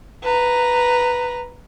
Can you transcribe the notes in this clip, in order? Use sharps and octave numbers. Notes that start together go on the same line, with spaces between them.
B4 A#5